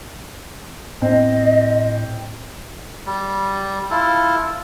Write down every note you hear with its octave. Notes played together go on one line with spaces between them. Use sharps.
A2 C4 D#5
G3
E4 F4 A4